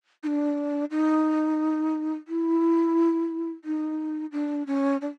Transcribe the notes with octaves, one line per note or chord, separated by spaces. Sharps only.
D#4
D4
D#4
E4
D#4
D4
C#4
D4